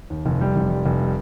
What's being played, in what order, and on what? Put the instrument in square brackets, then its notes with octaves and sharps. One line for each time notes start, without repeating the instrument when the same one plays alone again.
[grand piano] D#2
F1
G3
F1
G3
F1
G3